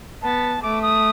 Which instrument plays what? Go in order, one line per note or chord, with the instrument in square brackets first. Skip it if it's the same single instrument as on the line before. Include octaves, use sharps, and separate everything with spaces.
[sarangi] B3 [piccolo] A5
[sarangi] A3 [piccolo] D6
[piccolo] D#6